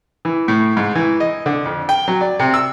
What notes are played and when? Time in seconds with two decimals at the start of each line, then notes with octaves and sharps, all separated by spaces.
0.25 E3
0.48 A2
0.77 G#2
0.95 E3
1.20 D#5
1.46 D3
1.65 F2
1.89 G5
2.08 F#3
2.21 D5
2.39 C3
2.54 E6